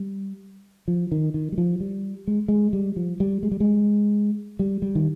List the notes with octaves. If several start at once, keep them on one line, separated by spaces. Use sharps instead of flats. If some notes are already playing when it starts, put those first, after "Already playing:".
Already playing: G3
F3
D#3
D#3
G3
F3
G3
G#3
G#3
G3
F3
G3
G#3
G3
G#3
G3
G3
D#3